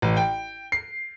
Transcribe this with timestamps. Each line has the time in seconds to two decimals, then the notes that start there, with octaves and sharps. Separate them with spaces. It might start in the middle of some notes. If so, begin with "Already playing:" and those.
0.02 A1
0.17 G5
0.72 C7